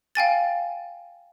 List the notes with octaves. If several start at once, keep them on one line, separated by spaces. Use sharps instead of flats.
F5 G5 G#5 A6